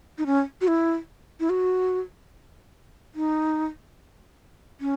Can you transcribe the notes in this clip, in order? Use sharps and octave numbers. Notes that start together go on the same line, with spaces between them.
D#4
C#4
F#4
E4
E4
F#4
D#4
C#4